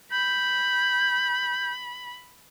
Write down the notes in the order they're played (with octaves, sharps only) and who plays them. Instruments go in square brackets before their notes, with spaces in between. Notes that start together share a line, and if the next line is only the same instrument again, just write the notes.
[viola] B5 [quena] G6